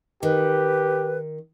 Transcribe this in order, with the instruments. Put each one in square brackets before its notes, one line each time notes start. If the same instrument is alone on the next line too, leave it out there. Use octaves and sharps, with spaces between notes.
[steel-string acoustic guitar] D#3 [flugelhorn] G4 [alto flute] B4